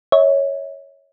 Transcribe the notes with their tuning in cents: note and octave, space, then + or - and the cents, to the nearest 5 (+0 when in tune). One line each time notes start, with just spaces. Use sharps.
C#5 +0 E5 -45